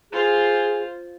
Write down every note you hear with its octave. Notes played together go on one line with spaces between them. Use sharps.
F4 G#4 C5